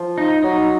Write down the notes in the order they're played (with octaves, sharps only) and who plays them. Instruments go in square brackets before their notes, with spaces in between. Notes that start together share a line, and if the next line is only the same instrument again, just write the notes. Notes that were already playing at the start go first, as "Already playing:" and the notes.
Already playing: [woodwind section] F3
[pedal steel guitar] D#4
[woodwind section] F#3 [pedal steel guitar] D#4